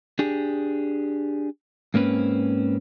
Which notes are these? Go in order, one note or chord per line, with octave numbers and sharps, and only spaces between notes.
D4 G4 G#4
G#2 A#3 C4 C#4 B4